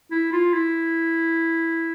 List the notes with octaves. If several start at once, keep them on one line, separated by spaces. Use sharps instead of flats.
E4
F4
E4